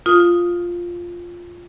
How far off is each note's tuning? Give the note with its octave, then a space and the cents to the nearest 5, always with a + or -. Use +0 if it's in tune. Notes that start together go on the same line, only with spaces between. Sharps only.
F4 +0 D#6 +0